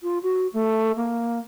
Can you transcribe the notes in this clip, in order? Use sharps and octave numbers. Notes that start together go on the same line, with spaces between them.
F4
F#4
A3
A#3